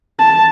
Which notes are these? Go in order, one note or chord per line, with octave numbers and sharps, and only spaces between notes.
A5